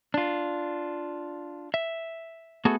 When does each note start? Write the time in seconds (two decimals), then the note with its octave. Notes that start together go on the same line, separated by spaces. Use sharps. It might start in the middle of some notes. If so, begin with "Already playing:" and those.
0.14 D4 F4
1.74 E5
2.65 A3 B3 F#4 G#4 A4